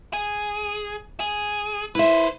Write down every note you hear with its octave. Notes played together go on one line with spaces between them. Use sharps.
G#4
G#4
E4 B4 C5 E5